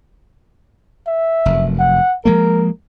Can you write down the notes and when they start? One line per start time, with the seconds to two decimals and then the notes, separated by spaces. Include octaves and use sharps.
1.07 E5
1.46 F1 F#2
1.79 F#5
2.25 F3 G#3 A#3 A#4